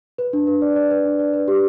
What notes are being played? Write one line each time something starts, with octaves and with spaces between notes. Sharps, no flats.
B4
D4
B4
D5
D5
B4
D4
D5
B4
G4